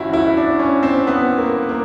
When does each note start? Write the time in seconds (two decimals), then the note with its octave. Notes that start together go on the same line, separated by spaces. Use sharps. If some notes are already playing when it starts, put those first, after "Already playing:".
Already playing: G1 G2 E3 C#4 E4 F#4
0.13 E4
0.37 D4
0.59 C#4
0.83 C4
1.07 B3
1.38 A#3
1.69 A#3